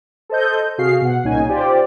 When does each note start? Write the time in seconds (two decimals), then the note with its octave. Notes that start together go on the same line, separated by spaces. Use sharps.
0.30 A4 C5 D#5 G6
0.78 C3 F#4 G#4 F5 C7
1.01 B2 F#5
1.24 C2 A#2 C#3 C#4 D#4 G#5
1.49 F4 G4 C5 D5